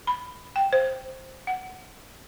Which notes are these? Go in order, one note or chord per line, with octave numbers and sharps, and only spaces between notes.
B5
G5
C5
F#5